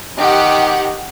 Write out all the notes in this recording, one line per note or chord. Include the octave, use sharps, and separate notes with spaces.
D#3 G4 F#5